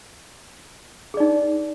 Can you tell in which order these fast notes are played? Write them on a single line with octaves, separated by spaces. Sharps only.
G#4 D5 D#4